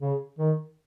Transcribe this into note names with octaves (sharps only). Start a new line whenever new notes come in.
C#3
D#3